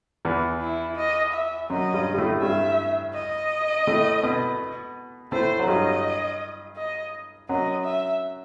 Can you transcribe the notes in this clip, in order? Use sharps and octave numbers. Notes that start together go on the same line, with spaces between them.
E2 E3
E4
D#5
E5
F#2 F#3 D#5
G2 G3
G3
A2 A3
G2 G3 E5
D#5
A2 A3
B2 B3
A2 A3 C5
F#3
G2 G3 D#5
D#5
F#2 F#3 D#5
E5